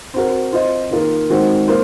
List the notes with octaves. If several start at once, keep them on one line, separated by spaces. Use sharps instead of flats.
C4 F#4 A#4
C4 F4 C5 D#5
D#3 A#3 F4 A#4
D#3 G#3 C4 F#4
A#3 F4 C5